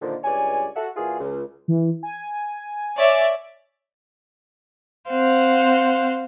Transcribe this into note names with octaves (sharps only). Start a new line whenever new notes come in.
A#2 D3 D#3 F3
C#2 G2 C#5 D5 G#5
F#4 A4 E5 F#5
A#2 E3 F4 F#4 G#4
C#2
E3
G#5
C#5 D5 E5
C4 C5 F5 F#5